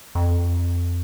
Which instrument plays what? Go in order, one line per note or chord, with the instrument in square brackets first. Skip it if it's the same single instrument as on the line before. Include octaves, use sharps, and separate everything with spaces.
[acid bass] F2